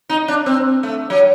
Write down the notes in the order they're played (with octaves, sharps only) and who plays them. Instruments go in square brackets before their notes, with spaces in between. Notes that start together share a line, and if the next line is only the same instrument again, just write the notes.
[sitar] D#4
D4
C4
A3
F#3